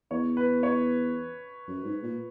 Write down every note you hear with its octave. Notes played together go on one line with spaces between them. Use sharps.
E2 C#5
B4
C#5
F#2
G#2
A#2